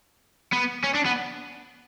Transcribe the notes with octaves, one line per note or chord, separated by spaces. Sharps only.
B3
C#4
D4
B3